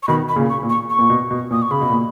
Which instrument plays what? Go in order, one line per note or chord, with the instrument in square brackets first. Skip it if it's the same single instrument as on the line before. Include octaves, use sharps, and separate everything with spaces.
[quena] C#6
[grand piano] B2 D#3 [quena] B5
[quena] B5
[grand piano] A#2 C#3
[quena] C#6
[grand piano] A#2
[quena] C#6
C#6
[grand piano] A#2
B2
B2
[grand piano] A#2 [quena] D#6
[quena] C#6
[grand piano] C#3 [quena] B5
[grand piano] B2
A#2